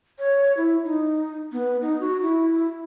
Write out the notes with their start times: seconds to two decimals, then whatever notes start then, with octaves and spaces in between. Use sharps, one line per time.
0.19 C#5
0.57 E4
0.85 D#4
1.52 B3
1.82 D#4
2.00 F#4
2.22 E4